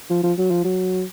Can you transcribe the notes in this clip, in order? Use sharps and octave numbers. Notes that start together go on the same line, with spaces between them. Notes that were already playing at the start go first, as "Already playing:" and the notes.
F3
F3
F#3
F3
F#3